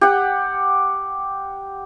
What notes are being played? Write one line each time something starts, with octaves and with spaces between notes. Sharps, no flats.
G4 F#5